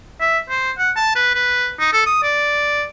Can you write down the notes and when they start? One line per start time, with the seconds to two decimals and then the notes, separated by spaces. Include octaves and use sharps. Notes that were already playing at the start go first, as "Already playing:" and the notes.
0.21 E5
0.49 C5
0.78 F#5
0.96 A5
1.16 B4
1.35 B4
1.80 D#4
1.93 A4
2.06 D#6
2.23 D5